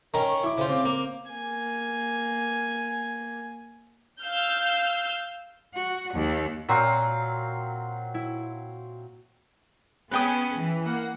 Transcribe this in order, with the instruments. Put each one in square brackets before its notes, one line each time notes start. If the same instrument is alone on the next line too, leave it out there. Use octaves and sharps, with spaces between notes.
[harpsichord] D#3 C#4 [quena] A#4 [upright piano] A#5
[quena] C#6
[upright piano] E4 D6
[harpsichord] C#3 F4 [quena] C5
[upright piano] C4 [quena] D6
[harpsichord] A#3
[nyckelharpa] A#3 G#5
[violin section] F5 E6 F6 G6
[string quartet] F#4
D#2
[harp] A#2 F#4 A#5 [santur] F#3 C4 F5
[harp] E4
[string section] B3 C#4 G#4 [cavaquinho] B4 G5 D#6
[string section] E3
A#3 F#5